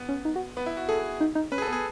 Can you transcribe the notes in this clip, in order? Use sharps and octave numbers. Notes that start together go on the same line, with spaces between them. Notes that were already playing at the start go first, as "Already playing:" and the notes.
Already playing: B3
C#4
D#4
F#4
B3 B4
E4
F#4
G#4 A4
D#4
D#4
C#4 B4
G#4
A4
B3
G#4